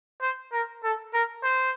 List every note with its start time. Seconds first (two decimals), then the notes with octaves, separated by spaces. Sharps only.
0.22 C5
0.53 A#4
0.84 A4
1.14 A#4
1.44 C5